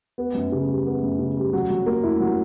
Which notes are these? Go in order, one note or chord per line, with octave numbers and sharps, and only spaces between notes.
B3
F#2
C#3
G3
B3
F#2
C#3
G3
F#3
F#3
A#3
E4
F#3